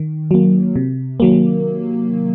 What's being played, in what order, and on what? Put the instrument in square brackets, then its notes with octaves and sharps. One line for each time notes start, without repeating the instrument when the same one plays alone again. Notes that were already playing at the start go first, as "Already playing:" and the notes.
Already playing: [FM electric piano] D#3
F#3 A#3
C3
D#3 F#3 A#3